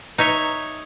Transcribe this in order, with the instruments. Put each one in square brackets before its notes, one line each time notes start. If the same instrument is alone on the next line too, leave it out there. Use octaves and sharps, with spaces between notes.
[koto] D#4 C#5 E5